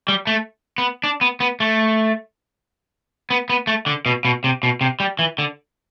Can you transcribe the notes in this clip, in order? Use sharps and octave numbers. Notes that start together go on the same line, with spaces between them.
G3
A3
B3
D4
B3
B3
A3
B3
B3
A3
D3
B2
B2
C3
B2
C3
G3
E3
D3